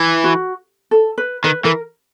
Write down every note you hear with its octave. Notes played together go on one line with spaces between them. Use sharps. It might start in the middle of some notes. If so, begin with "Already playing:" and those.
Already playing: E3
F#4
A4
B4
D#3 B4
E3 A#4